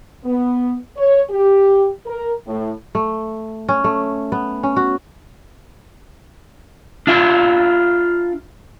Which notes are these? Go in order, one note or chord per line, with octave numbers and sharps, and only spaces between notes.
B3
C#5
G4
A#4
A2
A3
C#4
A3
B3
C#4
F#4
D4 F4 E5